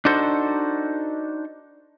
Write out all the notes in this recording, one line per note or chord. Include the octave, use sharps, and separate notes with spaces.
D4 D#4 F#4 A4 C5